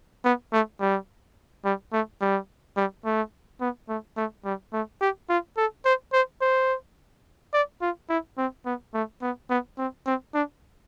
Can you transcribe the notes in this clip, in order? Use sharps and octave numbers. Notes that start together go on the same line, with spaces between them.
B3
A3
G3
G3
A3
G3
G3
A3
B3
A3
A3
G3
A3
G4
F4
A4
C5
C5
C5
D5
F4
E4
C4
B3
A3
B3
B3
C4
C4
D4